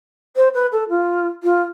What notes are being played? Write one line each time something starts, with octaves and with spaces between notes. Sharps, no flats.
C5
B4
A4
F4
F4